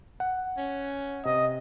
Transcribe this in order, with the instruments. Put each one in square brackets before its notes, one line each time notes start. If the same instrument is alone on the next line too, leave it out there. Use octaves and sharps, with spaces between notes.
[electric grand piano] F#5
[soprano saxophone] C#4
[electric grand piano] C3 [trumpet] D#5